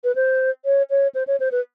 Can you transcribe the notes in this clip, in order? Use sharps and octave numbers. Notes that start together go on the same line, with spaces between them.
B4
C5
C#5
C#5
C5
C#5
C5
B4